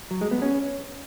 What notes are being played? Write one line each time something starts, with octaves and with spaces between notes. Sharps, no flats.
F#3
G#3
B3
C#4